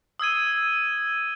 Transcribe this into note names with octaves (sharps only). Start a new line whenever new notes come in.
D#6 E6 G#6 D#7